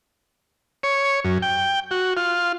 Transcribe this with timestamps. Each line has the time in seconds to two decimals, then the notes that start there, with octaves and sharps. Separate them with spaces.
0.83 C#5
1.25 F#2
1.42 G5
1.91 F#4
2.17 F4